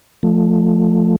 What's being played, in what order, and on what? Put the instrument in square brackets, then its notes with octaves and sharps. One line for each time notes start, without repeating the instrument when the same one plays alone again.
[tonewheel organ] F3 A3